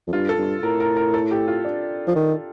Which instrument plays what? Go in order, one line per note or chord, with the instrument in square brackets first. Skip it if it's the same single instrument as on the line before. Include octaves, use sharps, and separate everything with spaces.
[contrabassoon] F2
[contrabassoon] G2 [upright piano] F4
[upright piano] A4
[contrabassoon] G2
[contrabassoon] A2 [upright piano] A#4
[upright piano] A#4
A#4
A4
G4
F4
D4
[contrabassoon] F3
D#3